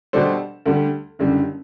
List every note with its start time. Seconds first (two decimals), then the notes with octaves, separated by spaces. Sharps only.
0.13 B2 G3 D4 A4 C5
0.66 D2 D3 G3
1.19 F#1 F#2 D3 G3